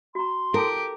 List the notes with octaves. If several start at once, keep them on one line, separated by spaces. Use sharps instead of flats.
F#4 A#5 C6
E4 G4 A4 A#4 A5